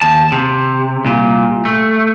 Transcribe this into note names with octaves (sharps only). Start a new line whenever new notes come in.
D#2 A5
C3
C2 A#2
A3